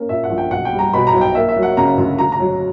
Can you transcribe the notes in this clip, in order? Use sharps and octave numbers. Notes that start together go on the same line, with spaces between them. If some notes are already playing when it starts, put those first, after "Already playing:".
Already playing: A#3 C#4
A#2 E5
F#5
A#1
G5
B1 F#5
G5
G3
A#5
B2 B5
A#5
B1
G5
A#3 E5
E5
F#3
F#5
C#3 A#5
D2
D2 A#5
A#5
F#3